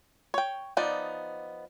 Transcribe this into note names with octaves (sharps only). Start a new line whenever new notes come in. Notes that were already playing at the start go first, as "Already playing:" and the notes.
C#5 G5
F3 B3 D#4 D5